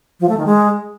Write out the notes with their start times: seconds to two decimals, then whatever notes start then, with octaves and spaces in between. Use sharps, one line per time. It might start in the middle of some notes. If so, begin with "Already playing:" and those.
0.20 F3
0.29 A3
0.38 D#3
0.46 G#3